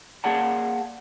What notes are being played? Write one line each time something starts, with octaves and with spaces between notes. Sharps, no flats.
A#3 G#4 D5 F#5 A5